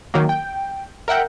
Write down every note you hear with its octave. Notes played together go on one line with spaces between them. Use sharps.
D#3 F#3 A#3
G5
A#4 E5 F#5 G5